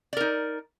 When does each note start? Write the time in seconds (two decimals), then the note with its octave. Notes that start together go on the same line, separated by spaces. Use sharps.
0.13 D5
0.17 A#4
0.21 D#4